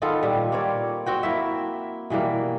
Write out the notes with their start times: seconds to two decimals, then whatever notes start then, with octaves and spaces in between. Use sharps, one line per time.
0.02 D#3 B3 F4 A4
0.23 A#2 G3
0.52 A#3 C4 C#5 D5
1.06 C4 F#4 G5
1.23 A#3 E4 E5
2.10 B2 E3 G3 A#3